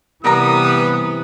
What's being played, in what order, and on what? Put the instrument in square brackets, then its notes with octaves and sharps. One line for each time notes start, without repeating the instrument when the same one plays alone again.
[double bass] C3 E3 [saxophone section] G3 B3 [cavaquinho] A#4 A#5 [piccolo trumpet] D#6